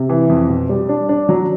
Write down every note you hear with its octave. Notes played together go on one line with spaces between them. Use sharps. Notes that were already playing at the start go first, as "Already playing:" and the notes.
Already playing: C3
E3
F2
B2
G3
D4
D4
F#3